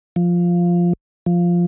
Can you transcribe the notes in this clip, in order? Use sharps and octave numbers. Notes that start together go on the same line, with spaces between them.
F3
F3